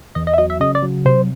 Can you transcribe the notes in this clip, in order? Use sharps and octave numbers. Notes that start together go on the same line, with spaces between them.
E2 D#5
D#5
E5
F#3 D#5
E5
C#3 D#5
D5
F#3
C3 C5